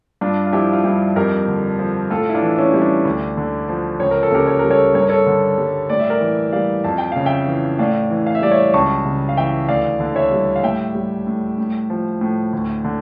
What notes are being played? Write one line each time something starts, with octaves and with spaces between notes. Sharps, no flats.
G2 D4 F4
F4
F3 E4 G4
F4
G2 E4 G4
F2 G4 A#4
D3
F3
A2 F4 A4
E4
D4 F4
E3
C#4 E4
G3 C#4
D4
D2
D3
F3
C#2 C#5
A#4
A4
C#3 G4 A#4
C#5
G3 A#4
A4 C#5
G2 C#5
A#4
A4 C#5
D3
G3
A2 D5
E5
A#4 D5
E3
G3 D5 F5
F2 A5
G5
C#3 F5
E5 G5
E3
A2 D5 F5
E3
F5
E5
G3 D5
C#5 E5
C#2 A5 C#6
C#3
F5
E3 E5 G5
D2 D5 F5
D3
C#5 E5
G3
F5
A2 E5 G5
G3
A2
A2
F3
A2
D2
D3